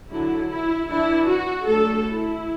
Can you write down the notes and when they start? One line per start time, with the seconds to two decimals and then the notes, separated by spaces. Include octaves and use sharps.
0.10 D3 F#3 D4 E4
0.50 E4
0.88 E3 D4 E4
1.28 F#4
1.67 F#3 A3 D4 A4
2.07 E4